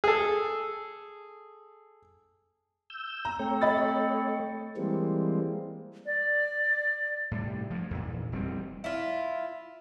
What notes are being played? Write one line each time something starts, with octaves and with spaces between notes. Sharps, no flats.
G#4 A4
E6 G6
A#5
A3 C4 C#5
D#5 B5 A6
E3 G3 G#3 A#3 C4
D5
A2 C3 G3
G2 F3
E2 A#2
E1 G3 B3 C4
E4 F4